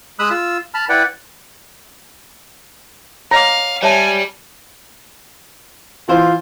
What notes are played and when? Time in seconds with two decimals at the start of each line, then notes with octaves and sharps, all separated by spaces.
0.19 G#3 B5 D#6 E6 F#6
0.30 F4 E6
0.74 A5 B5 F6
0.89 E4 B4 D5 F#5 G5
3.31 C#5 D#5 F5 A#5 D6
3.83 G3 C#5 E5 G#5 A5
6.08 E3 F4 C5